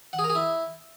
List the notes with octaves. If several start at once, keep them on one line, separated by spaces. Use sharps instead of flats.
F#5
G#4
A#4
G#4
E4